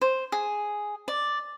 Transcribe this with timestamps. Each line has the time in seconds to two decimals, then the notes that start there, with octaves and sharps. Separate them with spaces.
0.01 C5
0.32 G#4
1.08 D5